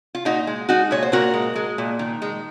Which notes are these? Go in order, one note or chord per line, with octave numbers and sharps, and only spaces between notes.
F4
A#2 D#4 F#4
G#3
G#3 D#4 F#4
A#2 C#5
C5
A#2 F#4 A#4
G#3
G#3
A#2
D#3
G#3